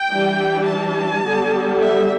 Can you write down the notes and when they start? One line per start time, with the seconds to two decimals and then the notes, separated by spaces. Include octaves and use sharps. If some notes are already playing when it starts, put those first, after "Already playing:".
Already playing: G5
0.11 E3 G3 D4
0.68 A5
1.24 D3 G3 B3
1.79 E5